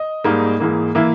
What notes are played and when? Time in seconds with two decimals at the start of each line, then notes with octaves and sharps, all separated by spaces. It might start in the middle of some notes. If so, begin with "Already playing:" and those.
Already playing: D#5
0.24 G#2 G3 A#3 D#4
0.60 G#2 E3 A#3
0.95 E3 A#3 E5